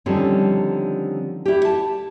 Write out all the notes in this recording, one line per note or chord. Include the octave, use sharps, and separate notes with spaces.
D3 D#3 F3 G3 C4 C#4
E4 G4
A5